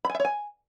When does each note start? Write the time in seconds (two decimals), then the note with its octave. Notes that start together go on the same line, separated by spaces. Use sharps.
0.05 B5
0.10 G#5
0.15 E5
0.20 C#5
0.25 G#5